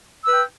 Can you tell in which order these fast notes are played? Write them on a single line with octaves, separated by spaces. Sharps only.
E6 B4 G5